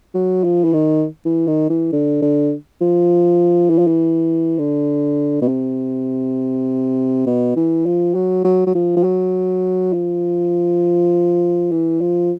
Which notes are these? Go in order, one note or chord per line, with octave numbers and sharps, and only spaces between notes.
F#3
F3
E3
D#3
E3
D#3
E3
D3
D3
F3
E3
F3
E3
D3
B2
C3
B2
E3
F3
F#3
F#3
F#3
F3
F3
F#3
F3
E3
F3